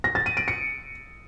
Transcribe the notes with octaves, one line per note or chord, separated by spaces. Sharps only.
A#6
A6
D#7
D7
C#7